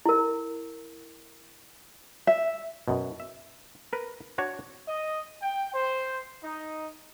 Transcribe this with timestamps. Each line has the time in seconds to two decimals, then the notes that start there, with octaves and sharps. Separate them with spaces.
0.05 E4 A#4
2.27 E5
2.88 F#2 B2
3.20 E5
3.93 A#4 B4
4.38 D4 F#4 C#5
4.86 D#5
5.41 G5
5.73 C5
6.41 D#4